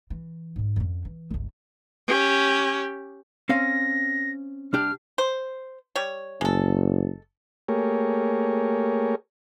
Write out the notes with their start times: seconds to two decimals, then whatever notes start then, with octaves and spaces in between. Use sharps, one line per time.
0.10 E3
0.56 G#2 D#3
0.76 F2 C#4
1.05 E3
1.31 G1 C#2
2.08 C#4 G4
3.49 C4 C#4 F5 A#6
4.73 C2 D4 G4 F6
5.18 C5
5.95 G3 C#5
6.41 F#1 G#3 A4
7.68 A3 A#3 G4 G#4 A#4 C#5